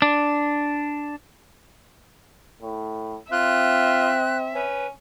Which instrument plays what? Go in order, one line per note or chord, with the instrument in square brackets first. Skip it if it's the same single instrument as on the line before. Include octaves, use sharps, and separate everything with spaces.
[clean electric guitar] D4
[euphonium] A2
[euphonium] C4 [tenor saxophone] F4 [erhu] E5 [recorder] F#6
[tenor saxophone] C#4 [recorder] B4